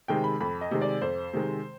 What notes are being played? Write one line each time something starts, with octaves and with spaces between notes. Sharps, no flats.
C3 D#3 G#3 G5
B5
F2 B5
D#5
C3 D#3 G#3
D5
F2 C5
C3 D#3 G#3